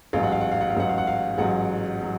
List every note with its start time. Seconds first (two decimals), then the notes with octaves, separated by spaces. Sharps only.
0.13 A1 G#2 F#3 F5
0.23 F#5
0.32 F5
0.41 F#5
0.51 F5
0.61 F#5
0.70 F5
0.75 A1 G#2 F#3 F#5
0.89 F5
0.98 F#5
1.07 F5
1.38 A1 G#2 F#3 F#5
2.02 F#3